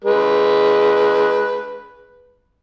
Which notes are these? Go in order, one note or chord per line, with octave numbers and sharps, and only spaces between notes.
G#3 B4